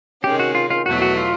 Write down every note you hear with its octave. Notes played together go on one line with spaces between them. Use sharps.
C3 D#3 G#3 C#4 G4
F#4
F4
F4
E2 B2 F#3 A3 F#4
F#4
F4